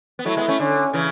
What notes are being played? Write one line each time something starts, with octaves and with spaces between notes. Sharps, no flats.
B3
F#3 A3 E4
G#3 B3
A3 C#4
D3 C#4
C#3 E3